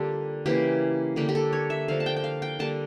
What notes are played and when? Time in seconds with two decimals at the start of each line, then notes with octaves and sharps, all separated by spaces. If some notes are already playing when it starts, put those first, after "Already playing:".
Already playing: D3 G3 A#3 F4 G4 A4
0.46 C#3 E3 A#3 G4
1.16 D3 G3 A#3 G4
1.29 G4
1.35 A4
1.53 C#5
1.70 E5
1.88 D3 F3 A#3 F5
2.00 A5
2.06 G5
2.16 G5
2.24 F5
2.42 G5
2.59 D3 G3 A#3 A5